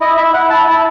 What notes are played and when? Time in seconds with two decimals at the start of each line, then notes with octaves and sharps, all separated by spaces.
0.01 E4 D#5
0.17 E4 E5
0.33 E4 F#5
0.50 E4 A5
0.67 E4 A5